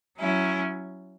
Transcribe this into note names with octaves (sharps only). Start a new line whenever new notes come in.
F#3 C#4 E4